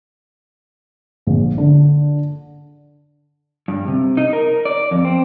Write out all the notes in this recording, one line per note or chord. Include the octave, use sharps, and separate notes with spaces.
A#1
D3
G2
C3
D#4
A#4
D5
F2
C4